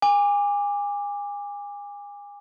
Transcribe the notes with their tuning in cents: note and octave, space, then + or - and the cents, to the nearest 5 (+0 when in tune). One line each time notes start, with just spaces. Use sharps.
G#5 -30 D6 +0